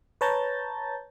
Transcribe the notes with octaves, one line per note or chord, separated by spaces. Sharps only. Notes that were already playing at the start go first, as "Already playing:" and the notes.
B4 C#5 A5 A#5 G6 A6